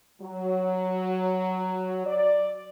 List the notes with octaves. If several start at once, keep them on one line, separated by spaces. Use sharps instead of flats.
F#3
D5